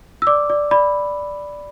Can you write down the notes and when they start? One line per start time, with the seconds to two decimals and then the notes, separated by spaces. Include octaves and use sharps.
0.22 E6
0.27 D5 D6
0.50 D5
0.71 D5 B5